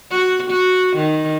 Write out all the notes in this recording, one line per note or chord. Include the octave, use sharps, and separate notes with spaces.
F#4
F#4
D#3